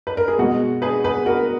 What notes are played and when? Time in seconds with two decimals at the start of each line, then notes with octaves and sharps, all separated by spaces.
0.07 B4
0.17 A#4
0.28 G#4
0.38 B2 G#3 F#4
0.82 G#4 B4
1.04 G#4 B4
1.26 F#4 A#4